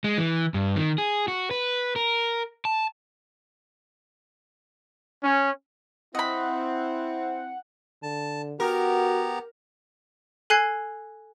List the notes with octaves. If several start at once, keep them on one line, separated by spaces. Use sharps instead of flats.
G#3
E3
G2
D#3
G#4
F#4
B4
A#4
A5
C#4
C4 E4 D#5 F#5 B5
D3 A5
B3 F#4 G4 A#4 A#5
A4 G#5 F#6 G#6 C7